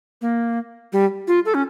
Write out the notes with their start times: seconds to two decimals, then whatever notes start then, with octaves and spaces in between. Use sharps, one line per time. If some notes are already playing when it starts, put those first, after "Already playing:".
0.22 A#3
0.93 G3
1.28 F4
1.46 A4
1.54 C#4